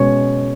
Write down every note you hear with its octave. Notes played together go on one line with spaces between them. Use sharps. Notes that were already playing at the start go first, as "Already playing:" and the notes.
Already playing: B2 G#3 C#4 C#5